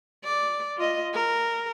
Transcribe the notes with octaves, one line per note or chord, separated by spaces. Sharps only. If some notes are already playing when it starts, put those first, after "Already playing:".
D5
F4 D#5
A#4